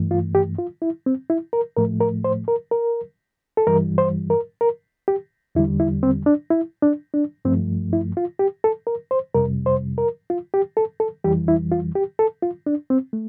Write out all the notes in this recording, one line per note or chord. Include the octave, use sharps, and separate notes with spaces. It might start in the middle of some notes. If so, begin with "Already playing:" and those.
Already playing: G2 E3 A3
F4
G4
F4
E4
C4
E4
A#4
A2 F3 A3 A#4
A#4
C5
A#4
A#4
A4
G2 E3 G3 A#4
C5
A#4
A#4
G4
E2 D3 G3 E4
E4
C4
D4
E4
D4
D4
G2 F3 A3 C4
E4
F4
G4
A4
A#4
C5
F2 C3 G3 A#4
C5
A#4
F4
G4
A4
A4
F2 E3 G3 G4
E4
F4
G4
A4
F4
D4
C4
A3